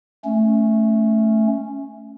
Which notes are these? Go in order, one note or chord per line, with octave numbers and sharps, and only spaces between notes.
A3 C#4